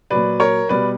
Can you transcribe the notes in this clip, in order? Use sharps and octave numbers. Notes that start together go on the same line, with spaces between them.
A#2 F#3 B4 D5
A#4 C#5
B2 G3 B4 D5